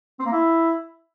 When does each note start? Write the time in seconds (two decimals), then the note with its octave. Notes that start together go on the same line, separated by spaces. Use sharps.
0.19 C4
0.26 A#3
0.32 E4